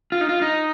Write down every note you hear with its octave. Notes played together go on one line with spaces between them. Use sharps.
F4
D#4
F4
D#4